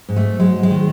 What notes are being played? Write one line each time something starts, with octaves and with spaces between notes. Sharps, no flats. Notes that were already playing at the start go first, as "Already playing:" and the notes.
G#2
A3
F#3 G#3
G#3
D#3